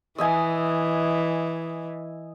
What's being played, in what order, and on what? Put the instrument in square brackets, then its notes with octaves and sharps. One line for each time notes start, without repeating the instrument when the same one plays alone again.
[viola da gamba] E3 [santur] D#5 E5 G#5